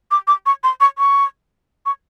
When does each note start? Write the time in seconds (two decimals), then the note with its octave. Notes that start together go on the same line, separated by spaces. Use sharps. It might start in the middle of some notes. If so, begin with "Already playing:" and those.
0.11 D6
0.27 D6
0.46 C#6
0.63 C6
0.81 C#6
0.98 C#6
1.86 C#6